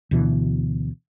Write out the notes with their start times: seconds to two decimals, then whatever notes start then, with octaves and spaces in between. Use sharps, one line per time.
0.11 D2 B2 E3